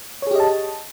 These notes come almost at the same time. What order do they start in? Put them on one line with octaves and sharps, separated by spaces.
C#5 G#4 G4 D#5 A5